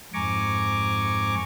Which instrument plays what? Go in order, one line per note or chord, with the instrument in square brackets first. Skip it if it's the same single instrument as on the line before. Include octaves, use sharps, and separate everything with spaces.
[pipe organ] F2 G#2 G#5 A#5 C#6 D6